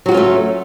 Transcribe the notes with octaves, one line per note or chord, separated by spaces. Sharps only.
F#3 A3 C#4 F4 F#4